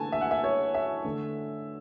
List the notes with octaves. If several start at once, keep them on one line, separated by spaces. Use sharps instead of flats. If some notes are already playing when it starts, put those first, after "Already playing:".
Already playing: D3 A3 G#5 A5
E5
F#5
E5
C#5
E5
D3 A3